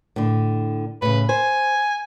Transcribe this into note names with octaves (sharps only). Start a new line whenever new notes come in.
A2 D3
A2 C#3 B4
C5 G#5